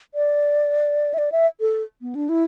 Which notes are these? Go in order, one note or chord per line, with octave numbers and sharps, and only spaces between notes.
D5
E5
D5
E5
A4
B3
D4
E4